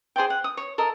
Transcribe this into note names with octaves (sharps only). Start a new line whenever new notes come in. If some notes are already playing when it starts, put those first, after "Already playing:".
G#4 C5 D5 G5
F#5
D#6
C#5
A4 A#4 D#5